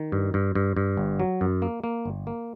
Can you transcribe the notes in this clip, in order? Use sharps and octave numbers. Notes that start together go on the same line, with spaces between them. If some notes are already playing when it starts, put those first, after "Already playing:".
Already playing: D#3
G2
G2
G2
G2
G1
F#3
F#2
A#3
A#3
G1
A#3